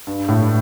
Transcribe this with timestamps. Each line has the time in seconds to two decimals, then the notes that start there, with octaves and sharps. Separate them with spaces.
0.07 G2
0.29 A2